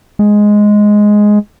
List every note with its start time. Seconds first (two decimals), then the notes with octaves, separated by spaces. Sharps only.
0.19 G#3